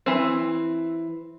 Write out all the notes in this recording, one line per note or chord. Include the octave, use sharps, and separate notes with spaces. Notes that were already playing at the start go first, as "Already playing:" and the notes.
E3 C4